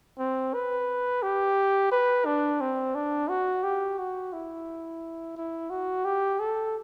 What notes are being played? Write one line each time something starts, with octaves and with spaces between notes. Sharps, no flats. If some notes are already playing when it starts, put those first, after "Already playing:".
C4
B4
G4
B4
D4
C4
D4
F#4
G4
F#4
E4
E4
F#4
G4
A4